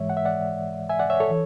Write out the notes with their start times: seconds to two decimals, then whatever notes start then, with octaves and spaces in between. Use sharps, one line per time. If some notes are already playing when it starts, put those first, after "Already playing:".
Already playing: G#2 E3 G#3 C#5 E5
0.10 F#5
0.17 E5
0.25 D5 F#5
0.89 E5 G#5
0.99 D5 F#5
1.10 C#5 E5
1.20 A4 C#5
1.30 E3